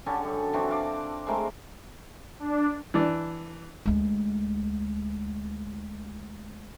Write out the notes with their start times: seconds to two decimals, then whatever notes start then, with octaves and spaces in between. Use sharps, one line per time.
0.06 D3 C#4 G4 A4
0.23 F#2
0.53 E3 C4 D4 F#4
0.71 F5 D6
1.27 G#3 A3 C4 A#4
2.40 D4
2.94 E3 D4
3.86 D2 G#3